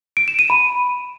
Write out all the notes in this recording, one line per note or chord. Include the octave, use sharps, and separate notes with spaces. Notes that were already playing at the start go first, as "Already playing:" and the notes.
D7
E7
D#7
B5